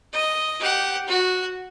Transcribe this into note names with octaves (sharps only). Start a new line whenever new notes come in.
D#5
G4 F#5
F#4